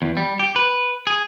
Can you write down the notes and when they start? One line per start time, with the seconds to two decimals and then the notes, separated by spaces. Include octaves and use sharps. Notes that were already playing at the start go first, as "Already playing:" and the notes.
0.02 E2
0.17 G3
0.39 G4
0.56 B4
1.07 G#4